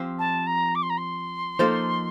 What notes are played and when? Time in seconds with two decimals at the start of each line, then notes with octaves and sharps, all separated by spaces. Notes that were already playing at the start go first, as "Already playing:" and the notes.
Already playing: F3 C4 G4 C5
0.19 A5
0.47 A#5
0.75 D6
0.83 C6
0.90 A#5
0.98 C6
1.59 F3 A#3 D#4 A4 C5